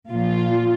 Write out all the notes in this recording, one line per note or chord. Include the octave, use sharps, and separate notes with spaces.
A#2 F3 F4